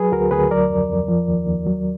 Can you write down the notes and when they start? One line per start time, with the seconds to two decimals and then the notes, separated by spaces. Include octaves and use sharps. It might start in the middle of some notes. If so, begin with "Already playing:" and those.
Already playing: F#3 G#4 B4
0.12 D2 F#4 A#4
0.31 D2 G#4 B4
0.51 F#3 A#4 D5
0.70 F2
0.89 F2
1.08 F3
1.28 D#2
1.47 D#2
1.66 F#3